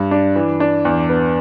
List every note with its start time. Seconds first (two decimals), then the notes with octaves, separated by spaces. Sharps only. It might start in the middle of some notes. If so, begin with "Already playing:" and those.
Already playing: G2
0.11 D4
0.36 E3
0.60 D4
0.85 E2
1.09 B3